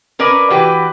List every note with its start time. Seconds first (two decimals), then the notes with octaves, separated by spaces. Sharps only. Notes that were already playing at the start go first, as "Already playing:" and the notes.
0.19 C#4 A#4 B4 D5
0.50 E3 F#4 G4 B4